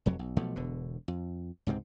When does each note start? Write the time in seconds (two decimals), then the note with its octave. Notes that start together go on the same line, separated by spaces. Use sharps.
0.06 F1 F2 F#3
0.19 B1
0.36 B1 B2 F3 A3
0.56 E1 B2 D3
1.08 F2
1.67 C#2 G#2 C3 C4